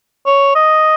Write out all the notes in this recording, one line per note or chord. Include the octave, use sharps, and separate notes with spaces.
C#5
D#5